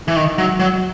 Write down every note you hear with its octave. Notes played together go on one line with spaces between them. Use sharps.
E3
D#3
F#3
F#3